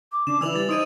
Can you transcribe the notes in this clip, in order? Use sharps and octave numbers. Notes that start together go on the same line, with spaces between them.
D6
C#3 D4 D6 E7
E3 E4 B4 D5 G#5 E6 F7 F#7
G3 A6
D#4 C5 C6 D#6 G#6 D7 D#7